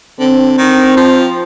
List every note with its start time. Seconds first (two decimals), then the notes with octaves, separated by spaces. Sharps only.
0.20 D3 C4
0.58 D#3
0.97 F3